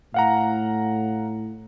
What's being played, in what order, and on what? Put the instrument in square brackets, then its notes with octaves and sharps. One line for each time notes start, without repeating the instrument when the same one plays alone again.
[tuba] A2 [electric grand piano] F5 F#5 A#5